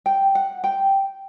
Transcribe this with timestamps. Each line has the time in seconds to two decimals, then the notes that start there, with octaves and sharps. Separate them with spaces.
0.06 G5
0.35 F#5
0.64 G5